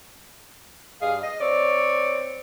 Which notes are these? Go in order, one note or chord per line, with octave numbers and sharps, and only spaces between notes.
G2 G#4 D#5 F5
D#5
C4 C#5 D5